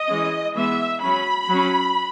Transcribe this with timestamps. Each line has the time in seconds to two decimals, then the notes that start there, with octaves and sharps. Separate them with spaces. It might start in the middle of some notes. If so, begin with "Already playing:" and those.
Already playing: D#5
0.08 E3 G#3 C#4
0.55 E3 G#3 B3 E5
1.01 F#3 C#4 B5
1.49 F#3 C#4